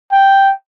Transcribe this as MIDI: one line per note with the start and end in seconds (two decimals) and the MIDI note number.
0.12 0.52 79